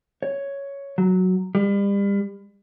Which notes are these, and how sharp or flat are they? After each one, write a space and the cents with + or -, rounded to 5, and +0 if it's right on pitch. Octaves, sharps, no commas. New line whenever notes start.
C#5 +5
F#3 +0
G3 +35